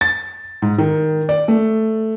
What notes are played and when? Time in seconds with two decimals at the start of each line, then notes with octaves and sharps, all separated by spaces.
0.01 A6
0.62 G#2
0.78 D#3
1.29 D5
1.48 A3